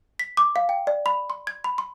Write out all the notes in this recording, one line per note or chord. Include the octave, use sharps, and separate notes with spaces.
B6
D6
F5
G5
D5
B5
C6
G#6
B5
C6